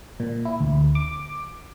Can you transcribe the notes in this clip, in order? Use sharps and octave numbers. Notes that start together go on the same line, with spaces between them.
A#2
E4
D2
D6